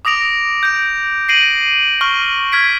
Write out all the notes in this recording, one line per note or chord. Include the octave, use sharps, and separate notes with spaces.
D6 D#6 A#6 D7 F7
G6 D7
A#6 C7 D7 D#7 F#7
C#6 F6 G7
F6 G#6 B6 D7